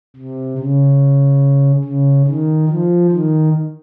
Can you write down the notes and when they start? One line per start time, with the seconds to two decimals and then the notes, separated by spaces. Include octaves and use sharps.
0.16 C3
0.58 C#3
1.84 C#3
2.27 D#3
2.69 F3
3.11 D#3